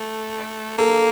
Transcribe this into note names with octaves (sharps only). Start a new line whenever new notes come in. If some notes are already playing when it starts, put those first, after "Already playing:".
Already playing: A3
A#3 A4